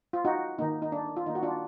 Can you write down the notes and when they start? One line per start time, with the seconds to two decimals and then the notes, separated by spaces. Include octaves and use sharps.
0.13 F4
0.25 D#4 F#4
0.59 D#3 A#3 D#4
0.82 D#4
0.92 D4
1.17 F4
1.26 D#3 A#3 D#4
1.35 F#4
1.43 D4 F4